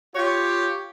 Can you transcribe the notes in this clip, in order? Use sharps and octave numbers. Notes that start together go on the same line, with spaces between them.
F4 G4 C#5